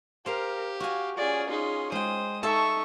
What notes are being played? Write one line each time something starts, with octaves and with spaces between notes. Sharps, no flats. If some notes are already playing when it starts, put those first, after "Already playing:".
G4 A#4 C5 F5
F#4 F5 G#5
C#4 F4 G#4 D5
D#4 G#4 C6
G#3 C5 G5 D#6
D#4 A4 E5 A5 C#6